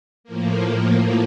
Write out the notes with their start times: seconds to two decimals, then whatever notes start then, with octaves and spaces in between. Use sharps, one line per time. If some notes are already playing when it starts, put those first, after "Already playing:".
0.24 A2 F3 A#3